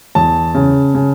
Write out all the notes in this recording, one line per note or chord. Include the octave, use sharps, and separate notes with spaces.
E2 A5
C#3
C#3